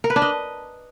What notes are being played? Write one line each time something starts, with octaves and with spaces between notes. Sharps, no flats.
A#4
B4
D4
D#5